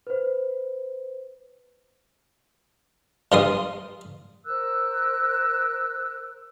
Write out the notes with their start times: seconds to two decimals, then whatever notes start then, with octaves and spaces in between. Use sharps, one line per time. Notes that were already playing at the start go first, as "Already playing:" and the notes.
0.07 B4 C5
3.32 G2 F4 A#4 C6 D#6
4.46 A#4 C5 E6 F#6